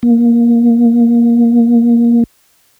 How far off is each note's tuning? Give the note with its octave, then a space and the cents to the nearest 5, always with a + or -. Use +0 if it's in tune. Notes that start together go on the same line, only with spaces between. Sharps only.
A#3 +15